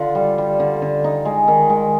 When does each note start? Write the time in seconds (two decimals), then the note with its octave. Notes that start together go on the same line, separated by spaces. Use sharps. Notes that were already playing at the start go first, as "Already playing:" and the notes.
Already playing: D3 F4
0.15 G3
0.38 G3
0.60 D3
0.82 D3
1.04 D#4
1.25 G#3
1.48 D#3
1.70 G#3